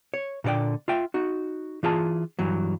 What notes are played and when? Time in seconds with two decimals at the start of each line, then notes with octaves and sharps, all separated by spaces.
0.14 C#5
0.44 A#2 D3 A4 D5 G5
0.88 F4 E5 G5
1.14 D#4 F#4
1.83 E3 F4 G#4 A5
2.39 G2 E3 F#3